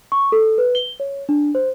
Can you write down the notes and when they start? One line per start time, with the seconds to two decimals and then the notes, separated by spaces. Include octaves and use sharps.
0.12 C#6
0.32 A4
0.58 B4
0.75 G7
1.00 C#5
1.29 D4
1.55 C5